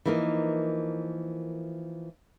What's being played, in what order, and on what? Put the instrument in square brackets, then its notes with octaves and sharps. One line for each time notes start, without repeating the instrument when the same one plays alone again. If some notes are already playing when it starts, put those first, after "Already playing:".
[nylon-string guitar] E3 F3 A#3 D#4 A#4